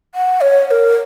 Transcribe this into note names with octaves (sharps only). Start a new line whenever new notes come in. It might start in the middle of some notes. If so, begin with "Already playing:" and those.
F#5
C#5
C#5
A#4